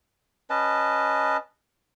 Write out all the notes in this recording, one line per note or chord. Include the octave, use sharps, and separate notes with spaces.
C#4 B4 D#5 A5